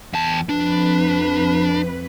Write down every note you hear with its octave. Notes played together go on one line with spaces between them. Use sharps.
E2 A5
F2 D4 B4